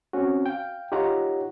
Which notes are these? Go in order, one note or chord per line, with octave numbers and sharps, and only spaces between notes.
C4 C#4 F#4
F5 G5
D#4 F4 G4 C#5 F#5 A#5